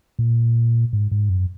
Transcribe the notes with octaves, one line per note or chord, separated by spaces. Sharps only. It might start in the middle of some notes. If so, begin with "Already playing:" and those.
A#2
G#2
G#2
F#2